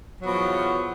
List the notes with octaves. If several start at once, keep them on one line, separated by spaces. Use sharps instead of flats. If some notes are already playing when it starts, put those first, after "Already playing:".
E2 B2 F3 F#3